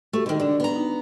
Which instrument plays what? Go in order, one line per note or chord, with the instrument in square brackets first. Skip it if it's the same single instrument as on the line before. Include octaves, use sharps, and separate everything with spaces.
[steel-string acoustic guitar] A3 [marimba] F#4 G4
[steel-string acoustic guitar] D3 D#3
[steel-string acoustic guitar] D3 [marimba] D4 D5
[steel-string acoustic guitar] B3 A#5
[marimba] D#4